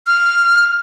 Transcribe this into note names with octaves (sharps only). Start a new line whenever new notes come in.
F6